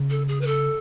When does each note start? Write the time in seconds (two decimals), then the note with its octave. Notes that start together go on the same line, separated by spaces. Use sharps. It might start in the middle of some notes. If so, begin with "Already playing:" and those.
Already playing: C#3
0.10 A4
0.28 G#4
0.41 B4
0.46 A4